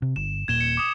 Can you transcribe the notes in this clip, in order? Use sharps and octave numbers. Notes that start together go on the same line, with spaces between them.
C3
G1 E7
D#1 A#2 G#6 E7 G7
C#7
D6 D#6